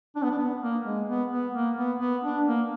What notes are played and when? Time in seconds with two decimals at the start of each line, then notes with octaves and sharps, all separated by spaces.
0.15 D4
0.23 B3
0.30 D4
0.38 B3
0.61 A#3
0.85 G#3
1.08 B3
1.31 B3
1.54 A#3
1.77 B3
2.00 B3
2.23 D4
2.46 A#3